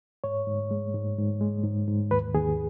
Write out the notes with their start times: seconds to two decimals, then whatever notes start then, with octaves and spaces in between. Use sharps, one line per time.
0.24 G#2 C#5
0.47 G#2
0.71 G#3
0.94 G#2
1.18 G#2
1.41 G#3
1.64 G#2
1.88 G#2
2.11 D#2 B4
2.34 D#2 G#4